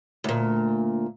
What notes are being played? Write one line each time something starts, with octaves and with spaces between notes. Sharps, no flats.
D2 A#2